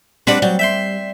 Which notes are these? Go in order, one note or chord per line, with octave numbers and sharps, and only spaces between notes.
G3 C4 D4 B4 F#5
F#3 G3
E5 G5 C6